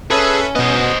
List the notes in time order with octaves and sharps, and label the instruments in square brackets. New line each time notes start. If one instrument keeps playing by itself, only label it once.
[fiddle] C#4 [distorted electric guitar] G#4 [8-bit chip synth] A4 B4 E5
[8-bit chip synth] B2 B3 [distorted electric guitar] C5 D#5